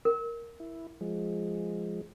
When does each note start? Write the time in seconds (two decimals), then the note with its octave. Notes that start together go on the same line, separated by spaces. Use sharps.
0.05 A#4
0.60 E4
1.01 F3 G#3